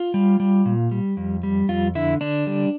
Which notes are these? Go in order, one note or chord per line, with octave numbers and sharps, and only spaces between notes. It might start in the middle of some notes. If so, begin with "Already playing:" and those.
Already playing: F4
G3
G3
A#2
G3
F2
G3
F2 F4
D3 E4
D3 D4
G3